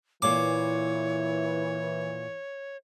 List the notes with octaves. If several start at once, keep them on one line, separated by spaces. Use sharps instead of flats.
A#2 E3 A#3 C#5 D6